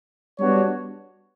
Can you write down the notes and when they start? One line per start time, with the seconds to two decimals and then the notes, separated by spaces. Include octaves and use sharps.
0.40 G3 B3 D4 F#4 C#5